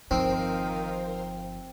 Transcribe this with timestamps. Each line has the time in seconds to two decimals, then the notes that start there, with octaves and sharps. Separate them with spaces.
0.11 G1 D#3 F3 C4 A#4 C5 F5